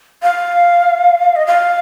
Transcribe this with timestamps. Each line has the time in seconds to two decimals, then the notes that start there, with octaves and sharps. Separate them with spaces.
0.23 F5
1.36 D#5
1.47 F5